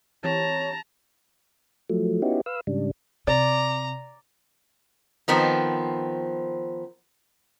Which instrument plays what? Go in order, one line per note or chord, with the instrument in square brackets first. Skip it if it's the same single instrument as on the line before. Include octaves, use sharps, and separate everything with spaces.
[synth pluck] E3 C4 G4 [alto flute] C#5 [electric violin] A5 A#5
[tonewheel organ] F3 F#3 A3
B3 C#4 D#4 E4 F#4 G4
B4 F5 E6
G#2 C#3 G3 D4
[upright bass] C3 [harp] D5 [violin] A#5
[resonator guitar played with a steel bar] D#3 F3 B3 C4